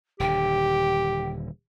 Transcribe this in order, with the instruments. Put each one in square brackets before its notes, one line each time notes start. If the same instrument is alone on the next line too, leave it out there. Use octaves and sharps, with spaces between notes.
[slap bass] D#1 D3 [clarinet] G4 [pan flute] G5